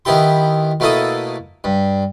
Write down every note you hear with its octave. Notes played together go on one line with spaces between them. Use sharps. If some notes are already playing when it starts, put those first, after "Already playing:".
D#3 B3 E4 G4 C6
B2 A3 A#3 E4 A4 D#6
G2